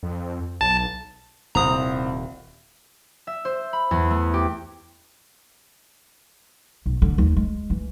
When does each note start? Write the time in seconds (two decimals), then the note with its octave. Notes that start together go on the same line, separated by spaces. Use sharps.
0.03 F2
0.61 B1 A5
1.55 D#1 C2 D#3 C4 A#5 D#6
3.27 E5
3.45 C5
3.73 B5
3.91 E2
4.10 A3
4.34 G4
6.86 B1
7.02 D3
7.18 D#2
7.36 G#3
7.70 E3